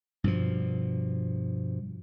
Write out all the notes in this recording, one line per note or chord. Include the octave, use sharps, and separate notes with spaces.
G2 B2 F3